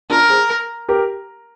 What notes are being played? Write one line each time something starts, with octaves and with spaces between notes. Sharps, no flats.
D4 F4 A#4
G#4 C5
G4 A#4